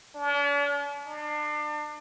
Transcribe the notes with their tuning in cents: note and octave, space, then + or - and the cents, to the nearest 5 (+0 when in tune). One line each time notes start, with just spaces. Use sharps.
D4 -45
D4 +35